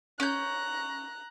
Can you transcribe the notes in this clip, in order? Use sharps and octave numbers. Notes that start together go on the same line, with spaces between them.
C#4 A#5 F#6 G6